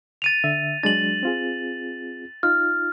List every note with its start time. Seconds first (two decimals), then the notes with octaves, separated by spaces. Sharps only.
0.22 A6 D#7 F7
0.44 D3 E5
0.83 F#3 G#3 D4 A6 F#7
1.23 C4 F4 G#4
2.43 D#4 F4 F6